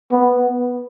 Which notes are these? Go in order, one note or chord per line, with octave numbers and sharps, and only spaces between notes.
B3